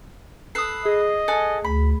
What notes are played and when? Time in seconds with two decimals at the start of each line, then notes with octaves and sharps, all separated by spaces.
0.55 A4 B4 D#6 C7
0.85 G#4 D#5
1.28 A4 F#5 G#5
1.64 D2 B5